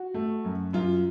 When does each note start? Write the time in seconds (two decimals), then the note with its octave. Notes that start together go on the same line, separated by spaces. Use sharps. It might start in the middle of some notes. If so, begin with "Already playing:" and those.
Already playing: F#4
0.14 A3
0.45 F#2
0.73 F#2 F4